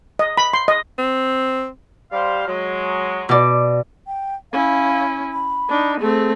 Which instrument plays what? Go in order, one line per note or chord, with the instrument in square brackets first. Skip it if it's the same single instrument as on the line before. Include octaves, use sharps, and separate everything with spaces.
[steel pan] D#5
B5
C6
D#5
[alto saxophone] C4
[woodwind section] G3 C5 F5
F#3 G#3
[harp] B2 D5
[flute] G5
[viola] C#4 E4 [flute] F5
[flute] B5
[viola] D4 D#4
[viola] A3 C4 [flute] G#4